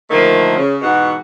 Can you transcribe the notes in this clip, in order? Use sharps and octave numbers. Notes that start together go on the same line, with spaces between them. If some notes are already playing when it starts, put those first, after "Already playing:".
D3 D#3 F3 A3 A#3
C#3
G#2 B2 E3 F#4 F#5